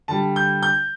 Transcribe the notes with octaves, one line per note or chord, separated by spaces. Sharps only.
D3 G3 A5
G6
G6